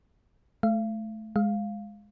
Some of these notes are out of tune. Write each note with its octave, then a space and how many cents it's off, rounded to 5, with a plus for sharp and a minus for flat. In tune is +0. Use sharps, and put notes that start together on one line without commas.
A3 -20 F5 -40
G#3 +0 F5 +0